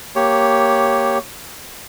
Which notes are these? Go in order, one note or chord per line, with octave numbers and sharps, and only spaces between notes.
A#3 G4 C#5